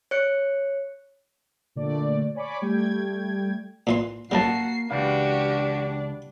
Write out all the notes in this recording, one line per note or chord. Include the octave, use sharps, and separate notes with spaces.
C#5 F#6 C#7
A#2 D3 A3 D5
C#5 D5 G#5 B5 C#6 D6
G3 A3 G5 G#6
A#2 E3 C6
F#2 F#3 G3 A#3 F#4 A5 C7
C#2 E3 D4 F#4 G4 F5